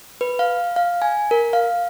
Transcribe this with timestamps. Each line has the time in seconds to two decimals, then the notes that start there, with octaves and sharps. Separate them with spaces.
0.21 B4
0.39 F5
0.76 F5
1.02 G#5
1.31 A#4
1.53 F5